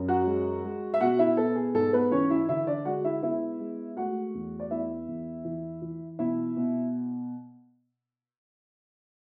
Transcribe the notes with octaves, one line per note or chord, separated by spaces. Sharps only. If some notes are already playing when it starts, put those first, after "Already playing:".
Already playing: F#2
F#4 F#5
G#3
G#3
E5
B2 F#4 F#5
E4 E5
B3 A4
G#4
G#2 A4
B3 B4
E3 C#4 C#5
E4 E5
D3 E4 E5
D4 D5
G#3 F#4 F#5
E4 E5
B3 E4 E5
G#3
A3 F#4 F#5
E2
D5
B3 E4 E5
E2
E3
E3
B2 E4 E5
B2